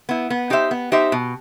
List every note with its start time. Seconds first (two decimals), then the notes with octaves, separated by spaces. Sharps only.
0.09 B3 E4
0.30 B3
0.50 D#4 G4 C5 E5
0.71 B3
0.92 D#4 G4 C5 E5
1.12 B2